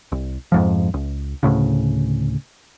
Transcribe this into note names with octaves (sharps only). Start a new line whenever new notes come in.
C2
F2 G#2 F3
C#2
D2 A2 C#3